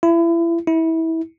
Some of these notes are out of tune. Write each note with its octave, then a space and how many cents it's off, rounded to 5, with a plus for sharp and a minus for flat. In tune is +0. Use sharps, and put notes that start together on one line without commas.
E4 +30
E4 -25